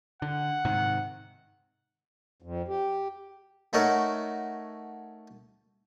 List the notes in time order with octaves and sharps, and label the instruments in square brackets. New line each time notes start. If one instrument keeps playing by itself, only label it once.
[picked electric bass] D3 [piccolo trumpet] F#5
[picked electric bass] G#2 C3 D#3
[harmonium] F2
G4
[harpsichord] A3 D#4 F#4 A4 A#4 C#5